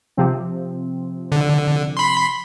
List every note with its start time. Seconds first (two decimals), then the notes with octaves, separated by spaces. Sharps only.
0.17 C3 F3 C4
1.32 D3
1.97 B5 C6